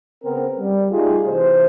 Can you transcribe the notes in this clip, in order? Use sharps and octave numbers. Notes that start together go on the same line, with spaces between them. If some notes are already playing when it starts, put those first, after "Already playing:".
C#3 B3 C4 A#4
G3
A3 D#4 F4 G4 G#4
C3 E3 C5